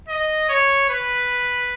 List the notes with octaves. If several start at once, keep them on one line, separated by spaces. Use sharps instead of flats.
D#5
C#5
B4